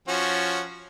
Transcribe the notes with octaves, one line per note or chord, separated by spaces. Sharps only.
F3 C#4 F#4